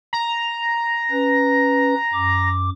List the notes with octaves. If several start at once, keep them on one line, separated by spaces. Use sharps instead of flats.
A#5
C#4 B4
F#2 D6